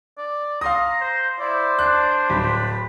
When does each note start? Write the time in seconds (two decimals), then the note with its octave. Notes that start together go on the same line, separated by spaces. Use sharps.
0.18 D5
0.61 F5 A#5 C6 D#6
1.00 C5
1.39 E4 C5 D5
1.79 D4 F#6
2.30 D1 B5